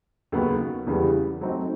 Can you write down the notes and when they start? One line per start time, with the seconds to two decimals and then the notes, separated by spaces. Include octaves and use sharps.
0.32 D#2 C#3 F#3 B3
0.87 E2 C#3 E3 G3 B3
1.41 F#3 A3 C4 D#4